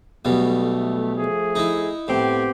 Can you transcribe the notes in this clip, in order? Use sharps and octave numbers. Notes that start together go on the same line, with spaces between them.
B1 B2 G3 A3
F3 A3 G#4
D#4 E4
A2 B3 C4 G4